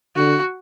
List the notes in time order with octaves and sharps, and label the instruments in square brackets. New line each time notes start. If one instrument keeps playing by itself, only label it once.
[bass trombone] D3 [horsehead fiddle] F#4